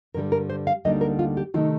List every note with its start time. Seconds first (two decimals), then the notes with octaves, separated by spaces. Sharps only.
0.14 G2 D3 G3 A#4
0.32 A#4
0.50 C5
0.67 F5
0.85 D2 D3 G3 A#3 D#4 D#5
1.01 A#4
1.19 F4
1.37 G4
1.54 C3 D#3 A3 D#4 F4